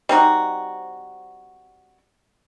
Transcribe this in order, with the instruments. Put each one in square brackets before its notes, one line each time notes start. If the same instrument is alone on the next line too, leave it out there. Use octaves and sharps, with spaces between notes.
[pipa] G3 C4 D#4 F#4